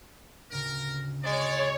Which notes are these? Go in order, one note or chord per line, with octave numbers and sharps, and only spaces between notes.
D2 A2 C#3 A#4
G#3 C#5 D5